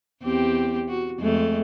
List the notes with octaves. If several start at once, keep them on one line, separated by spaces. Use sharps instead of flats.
E2 C4 G4
F#4
F2 G#3 A3